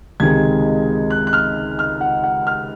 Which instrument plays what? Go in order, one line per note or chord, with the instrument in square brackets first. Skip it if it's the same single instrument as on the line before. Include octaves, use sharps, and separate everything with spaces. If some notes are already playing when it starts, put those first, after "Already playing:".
[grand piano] C#2 C3 D#3 G#3 D#4 G#6
F#6
F#6
F6
F6
F#5
F#5
F6